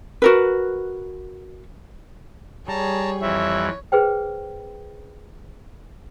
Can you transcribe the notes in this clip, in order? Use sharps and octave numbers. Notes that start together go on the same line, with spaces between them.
F#4 A#4 B4
G3 G#4 C#5 A5 A#5
F2 E3 C#5 E5
G#4 B4 C5 G5